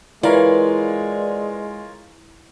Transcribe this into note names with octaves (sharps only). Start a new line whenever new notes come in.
E3 G#3 F4 A#4 B4 C#5 D5 F5